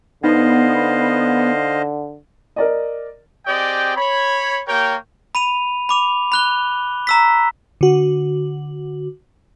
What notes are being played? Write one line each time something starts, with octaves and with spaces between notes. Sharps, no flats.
D3 B3 D#4 C5 D#5 F5
A#4 D5 D#5
C4 G4 G#4 D5 D#5 G5
C#5 B5
A#3 G4 A#4 C#5 G5
B5 D#7 F7
B5 D6 F7
B5 F#6 G7
A#5 E6 B6
D3 F#4